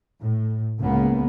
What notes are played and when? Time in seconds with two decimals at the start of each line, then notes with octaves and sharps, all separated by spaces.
0.20 A2
0.80 C#2 C#3 A#3 B3